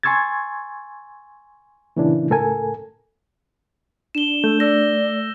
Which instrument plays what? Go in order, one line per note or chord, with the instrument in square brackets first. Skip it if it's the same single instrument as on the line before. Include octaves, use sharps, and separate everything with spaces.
[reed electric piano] G#5 C6 C#6 E6 G#6 A6
A#2 C#3 E3 A#3 D4 E4
C#2 A2 A4 A#4 G#5
[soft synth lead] D4 [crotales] E7 G7
[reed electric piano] A3 [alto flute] A4 [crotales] G6
[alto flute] D5 [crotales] E6 A#6